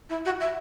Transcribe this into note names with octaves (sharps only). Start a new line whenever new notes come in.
E4
F#4
E5